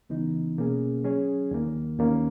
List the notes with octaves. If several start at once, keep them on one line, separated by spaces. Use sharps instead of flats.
C#2 C#3 E3 B3 D#4
B2 A#3 C#4 G#4
F#3 C#4 G#4 C#5
D#2 D#3 A#3
D#2 D#3 A#3 C#4